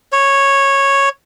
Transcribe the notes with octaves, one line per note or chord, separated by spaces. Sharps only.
C#5